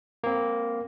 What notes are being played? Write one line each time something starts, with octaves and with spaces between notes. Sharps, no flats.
A#3 C4